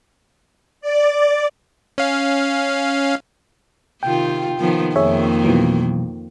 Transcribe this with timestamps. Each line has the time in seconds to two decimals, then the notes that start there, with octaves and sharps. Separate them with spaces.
0.81 D5
1.98 C#4 F5
4.03 C3 D#3 F4 G5
4.59 D#3 F3 B3
4.96 F2 D#3 A#3 G#4 C#5 E5
5.44 B2 E3 F#3